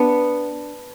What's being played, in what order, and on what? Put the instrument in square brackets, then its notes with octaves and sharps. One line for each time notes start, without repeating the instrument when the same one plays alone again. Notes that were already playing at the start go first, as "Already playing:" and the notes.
Already playing: [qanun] B3 D4